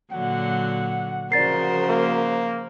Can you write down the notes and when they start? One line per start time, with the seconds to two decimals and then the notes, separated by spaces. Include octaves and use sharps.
0.12 A#2 D3 F#3 F#5
1.32 C#3 F3 F#4 A#4 C5 D5 A6 C7
1.88 A#3